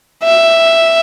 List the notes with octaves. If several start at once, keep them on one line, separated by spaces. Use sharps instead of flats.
E5